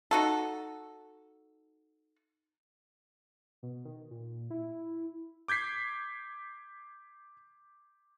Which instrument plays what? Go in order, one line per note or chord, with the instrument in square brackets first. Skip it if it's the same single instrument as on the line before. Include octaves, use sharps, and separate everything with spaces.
[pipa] D#4 F#4 A4
[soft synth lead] B2
D#3
A#2
E4
[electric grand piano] D6 G6 G#6 B6 C7